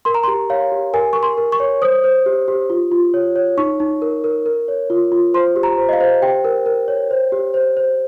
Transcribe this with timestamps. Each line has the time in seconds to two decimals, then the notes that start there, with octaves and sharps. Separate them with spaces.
0.05 A#4 C6
0.14 A#5
0.23 G4 C6
0.50 C#5 F5
0.72 G4
0.94 A#4 G#5
1.13 A#4 C#6
1.23 C6
1.38 A#4
1.52 C#6
1.60 C#5
1.82 C5 D#6
2.04 C5
2.26 G4
2.48 G4
2.70 F4
2.91 F4
3.14 C#5
3.36 C#5
3.58 D#4 C#6
3.80 D#4
4.02 A#4
4.24 A#4
4.46 A#4
4.68 C#5
4.90 F4
5.12 F4
5.34 C5 C6
5.56 G4
5.63 A#5
5.78 C5
5.89 D#5
5.93 F5
6.00 C5
6.22 G4 G5
6.44 A#4
6.66 A#4
6.88 C#5
7.11 C5
7.32 G4
7.54 C5
7.77 C5